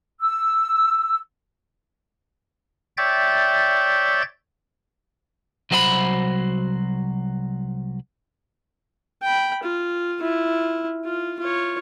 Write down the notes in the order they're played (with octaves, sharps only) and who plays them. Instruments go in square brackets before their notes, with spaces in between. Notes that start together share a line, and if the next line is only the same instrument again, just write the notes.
[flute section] E6
[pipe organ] C#5 D5 E5 G5 G6 A6
[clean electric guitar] C2 F#3 F#4 C5 D#5 B5
[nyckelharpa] G5 B5
F4
E4 F4
F4
F4 C#5